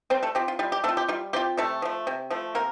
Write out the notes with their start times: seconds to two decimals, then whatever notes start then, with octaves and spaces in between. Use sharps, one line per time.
0.10 G3 C4 C5
0.23 A3 A4
0.35 C4 F4 G4
0.48 F4
0.59 G3 F4
0.72 G4
0.84 A3 C4 F4 A4
0.97 G4
1.08 G3 F4
1.33 C4 F4 G4
1.57 C3 A3 A4
1.82 F3 A3
2.07 C3
2.30 F3 A3
2.55 C3 A#3 A#4